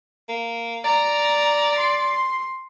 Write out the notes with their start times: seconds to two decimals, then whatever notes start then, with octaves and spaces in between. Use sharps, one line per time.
0.29 A#3
0.84 D5 A#5
1.78 C6